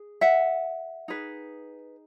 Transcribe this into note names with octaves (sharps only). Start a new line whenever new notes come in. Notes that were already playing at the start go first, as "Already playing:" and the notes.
Already playing: G#4
E5 F#5
D#4 G#4 B4